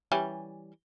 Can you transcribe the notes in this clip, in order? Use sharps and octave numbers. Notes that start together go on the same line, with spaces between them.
E3 G3 C#4